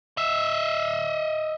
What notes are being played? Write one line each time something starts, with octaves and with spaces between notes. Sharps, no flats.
D#5 E5